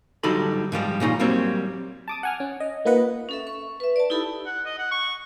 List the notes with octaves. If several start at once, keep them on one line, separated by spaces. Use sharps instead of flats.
D3 F#3 G3 D#4 A4 B5
G#2 F3 G3 G#3
A#2 C#3 D#4 F4
F#3 G3 A#3 C4 C#5
A5 D6 D#6
F#5 G#5 F6
C#4
D#5
A#3 D#4 F4 B4 D#5 F#5
C#4 A4 E5
C#6
B4 E5
D5 A5
D#4 E4 G4 A4 B5 E6
F#5
D#5
F#5
C#6